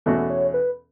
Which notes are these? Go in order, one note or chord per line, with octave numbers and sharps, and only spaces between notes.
E2 B2 A3 C#4 F#4 A4
C#5
B4